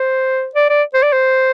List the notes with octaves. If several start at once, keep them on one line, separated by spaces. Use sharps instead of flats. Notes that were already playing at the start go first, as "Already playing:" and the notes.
Already playing: C5
D5
D5
C5
D5
C5